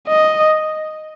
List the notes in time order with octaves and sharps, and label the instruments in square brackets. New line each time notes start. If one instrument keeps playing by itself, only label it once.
[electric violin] D#5